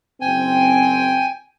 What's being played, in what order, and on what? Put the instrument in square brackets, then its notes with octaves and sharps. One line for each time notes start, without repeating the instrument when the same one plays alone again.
[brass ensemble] F#1 C4 [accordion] G5 G#5